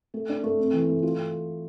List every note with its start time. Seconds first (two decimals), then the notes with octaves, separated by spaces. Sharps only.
0.14 A3
0.29 D4
0.43 A3
0.59 C4
0.73 E3
0.89 A3
1.03 F4